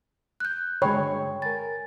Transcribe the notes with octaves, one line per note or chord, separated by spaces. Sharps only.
F#6 G6
G2 D3 G#3 C#5 G5 B5
A#4 G#5 A6